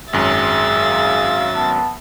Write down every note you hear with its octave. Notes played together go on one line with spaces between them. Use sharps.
G#1 F#2 F#3 G#4 E5 A6
F5
B3 A5